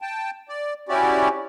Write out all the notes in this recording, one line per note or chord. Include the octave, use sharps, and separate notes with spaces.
G5 A5
D5
C#4 E4 F#4 G4 D5